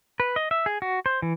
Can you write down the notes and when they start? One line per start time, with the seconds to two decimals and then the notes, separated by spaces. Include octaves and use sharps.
0.20 B4
0.36 D#5
0.51 E5
0.66 G#4
0.82 F#4
1.06 C5
1.22 E3